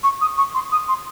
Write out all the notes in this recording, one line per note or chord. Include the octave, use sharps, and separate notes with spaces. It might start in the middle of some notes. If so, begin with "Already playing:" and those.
C#6
D#6
C#6
C6
D#6
C6